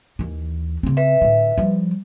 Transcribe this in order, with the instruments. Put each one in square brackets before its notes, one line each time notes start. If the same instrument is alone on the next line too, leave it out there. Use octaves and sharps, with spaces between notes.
[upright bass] D#2 E3
C#3 C4
[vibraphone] B4 E5
[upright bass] A2 D3
F3 G3